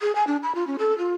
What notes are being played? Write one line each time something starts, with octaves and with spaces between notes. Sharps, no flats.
G#4
G#5
D4
B5
F4
C#4
A4
F4